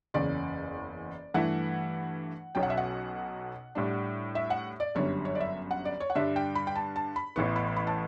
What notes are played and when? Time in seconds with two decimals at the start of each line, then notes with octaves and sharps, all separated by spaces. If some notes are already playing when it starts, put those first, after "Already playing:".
0.14 F#1 E2 C#3 D5
1.34 G2 E3 A3 E4 F#5
2.55 B1 B2 F#3 C#4 G5
2.63 F#5
2.70 E5
2.77 F#5
3.75 A2 G3 D4
4.35 E5
4.50 F#5
4.80 D5
4.95 G1 F#2 D3 G3 C#5
5.25 C#5
5.35 D5
5.40 E5
5.71 F#5
5.85 D5
6.00 C#5
6.10 F#5
6.15 G2 D3 G3 D4 E5
6.36 G5
6.55 B5
6.67 G5
6.76 A5
6.96 A5
7.16 B5
7.36 A1 A2 E3 B3 C#6
7.56 B5
7.76 B5
7.87 A5